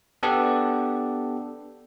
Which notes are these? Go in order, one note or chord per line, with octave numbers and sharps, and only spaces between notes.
B3 D4 G4 A4